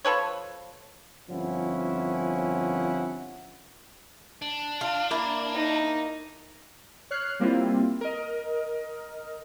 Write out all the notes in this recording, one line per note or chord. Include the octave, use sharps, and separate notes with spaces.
F3 A4 B4 C#5
G1 F3 C4 C#4 E4 F#5
D4
F4
A#3 E4
D#4
C#5 F6 F#6 C7
G3 A#3 C4 E4 F4
A#4 D#5